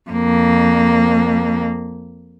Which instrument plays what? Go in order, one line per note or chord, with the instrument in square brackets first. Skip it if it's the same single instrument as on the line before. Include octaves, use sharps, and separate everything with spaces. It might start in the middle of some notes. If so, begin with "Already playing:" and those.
[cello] F2 A#3